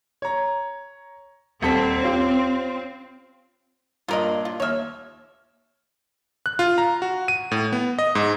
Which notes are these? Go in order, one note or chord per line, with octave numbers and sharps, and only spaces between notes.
C#5 A#5
D#1 C4 A4 B6
C#4 F4 G4
G2 A#2 F4 A#4 D#5
F4
D#2 C#5 E5 F6
F#6
F4
A#5
F#4
D#7
A2
B3
D#5
G#2